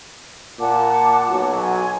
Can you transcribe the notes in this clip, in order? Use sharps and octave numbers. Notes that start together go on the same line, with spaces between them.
A#2 F#5 A5 D6
B1 F#3
G#5 C6